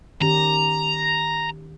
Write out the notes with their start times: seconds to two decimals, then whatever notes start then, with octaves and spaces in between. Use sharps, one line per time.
0.21 D#3 C#4 G4 A#5